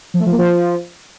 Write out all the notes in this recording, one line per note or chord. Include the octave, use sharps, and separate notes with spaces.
F3
A3
F3
A#3
F3